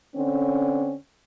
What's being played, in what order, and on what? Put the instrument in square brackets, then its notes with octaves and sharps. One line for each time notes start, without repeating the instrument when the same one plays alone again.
[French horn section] D3 C4 C#4